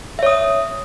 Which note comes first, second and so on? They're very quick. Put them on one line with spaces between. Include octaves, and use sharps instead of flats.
E5 C#5 D#6